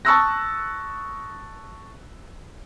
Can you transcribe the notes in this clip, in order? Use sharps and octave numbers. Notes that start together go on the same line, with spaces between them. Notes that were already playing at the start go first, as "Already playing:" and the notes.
A5 C#6 D#6 E6 F#6 A#6